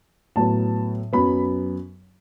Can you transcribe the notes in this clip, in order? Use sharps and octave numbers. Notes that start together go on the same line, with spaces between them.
A2 F#3 B3 A5
F#2 F#3 B3 B5